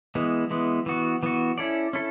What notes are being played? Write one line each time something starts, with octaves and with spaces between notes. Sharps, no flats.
E3 G#3 B3
E3 G#3 B3
E3 B3 F#4
E3 B3 F#4
C#4 E4 A4 D5
C#4 E4 A4